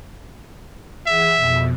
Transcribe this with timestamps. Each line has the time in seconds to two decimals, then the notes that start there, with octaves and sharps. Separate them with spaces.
1.06 E3 G#4 E5 F#5
1.36 F2 B2